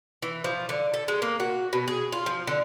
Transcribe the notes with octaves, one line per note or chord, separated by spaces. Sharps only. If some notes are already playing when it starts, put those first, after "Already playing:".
E3
F3
D3
A4
G#3
A#3
F#4
B2
G#4
F4
F3
D3